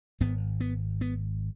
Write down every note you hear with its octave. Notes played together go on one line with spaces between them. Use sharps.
G#1 G#2 B3
B3
B3